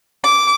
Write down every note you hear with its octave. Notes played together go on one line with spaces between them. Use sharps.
D6